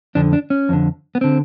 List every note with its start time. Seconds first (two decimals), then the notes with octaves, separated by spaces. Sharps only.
0.15 F2 D3 D4
0.33 D4
0.50 C#4
0.69 F2 D3
1.15 B3
1.21 D3 C4